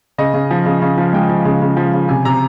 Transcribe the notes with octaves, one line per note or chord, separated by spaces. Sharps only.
C#3 D#5
C#3
F3
C#3
C#3
F3
G#3 G5
F3
C#3
C#3
F3
C#3
C3 G#5
C3 A#5